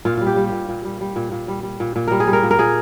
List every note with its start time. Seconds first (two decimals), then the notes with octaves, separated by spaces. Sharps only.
0.05 A#2 F4
0.17 G3 F4
0.27 G4
0.36 G3
0.47 G4
0.53 A#2
0.69 A#2
0.85 G3
1.01 G3
1.16 A#2
1.32 A#2
1.48 G3
1.63 G3
1.80 A#2
1.96 A#2
2.08 G3 A#4
2.20 G#4
2.27 G3
2.33 A#4
2.43 A#2
2.51 A#4
2.59 A#2 G#4